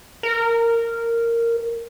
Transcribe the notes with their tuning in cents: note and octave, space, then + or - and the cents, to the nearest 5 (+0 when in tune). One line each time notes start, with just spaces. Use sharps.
A#4 -10